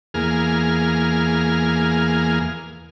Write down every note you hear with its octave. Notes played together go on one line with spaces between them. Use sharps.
E2 A#3 G#4 F6